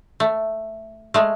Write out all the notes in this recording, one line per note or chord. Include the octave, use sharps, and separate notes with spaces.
A3
G#3 A3